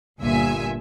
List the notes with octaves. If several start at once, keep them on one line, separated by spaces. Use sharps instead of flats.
G1 G2 A#2 E5 G#5